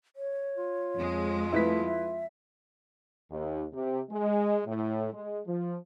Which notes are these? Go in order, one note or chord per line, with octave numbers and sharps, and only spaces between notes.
C#5
F4
F2 G#3
A3 E4 B4 B6
E5
D#2
C3
G#3
A2
G#3
F3